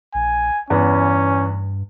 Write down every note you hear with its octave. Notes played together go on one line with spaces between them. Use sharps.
A#1 G#5
E2 G2 E3 B3 C#4